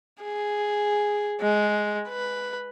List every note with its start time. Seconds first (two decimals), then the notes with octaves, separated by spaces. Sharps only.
0.23 G#4
1.41 G#3
2.08 B4